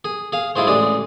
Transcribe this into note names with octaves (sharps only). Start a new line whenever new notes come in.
G#4
G#4 F5
G#3 E4 F4 G#4 C5
A1 G#3 D4 G#4